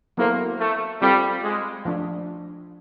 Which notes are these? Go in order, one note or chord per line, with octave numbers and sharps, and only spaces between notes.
F#3 A#3 B3 E4 A4 C5
A3
G3 C4 F4 A4
G#3
F3 A3 D4